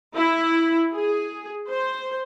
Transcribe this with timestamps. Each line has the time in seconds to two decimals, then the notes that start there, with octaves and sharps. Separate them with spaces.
0.14 E4
0.94 G#4
1.69 C5